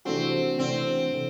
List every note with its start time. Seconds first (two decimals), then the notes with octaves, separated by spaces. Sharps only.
0.05 C3 E3 A3 C4 D4 F#4
0.59 C3 E3 A3 C4 D4 F#4
1.12 C3 E3 A3